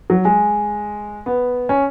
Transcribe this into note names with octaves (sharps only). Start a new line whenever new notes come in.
F#3
G#3
B3
C#4